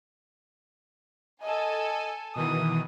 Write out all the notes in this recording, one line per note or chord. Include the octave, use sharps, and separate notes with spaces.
A4 D#5 G#5
B2 D#3 E3 D#6